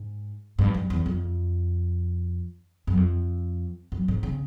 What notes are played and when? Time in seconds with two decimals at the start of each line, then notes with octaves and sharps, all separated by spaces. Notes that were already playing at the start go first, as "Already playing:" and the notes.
Already playing: G#2
0.59 G2
0.74 F#2
0.90 E2
1.06 F2
2.87 F#2
2.97 F2
3.92 F#2
4.08 G#2
4.23 C#3